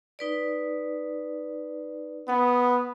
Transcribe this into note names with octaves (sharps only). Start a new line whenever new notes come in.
D#4 B4 D5
B3 D#6